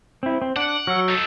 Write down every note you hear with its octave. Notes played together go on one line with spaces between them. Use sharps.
C4 E4
C4
D4 F#5 D7
F#3 F#4 E6 F6
D#4 A4